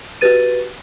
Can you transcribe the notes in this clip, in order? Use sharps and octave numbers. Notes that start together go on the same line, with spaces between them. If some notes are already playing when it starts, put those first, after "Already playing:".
F#4 G4 B4 A6 D#7